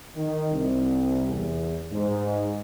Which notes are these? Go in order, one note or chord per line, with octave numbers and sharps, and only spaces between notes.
D#3
C2
E2
G#2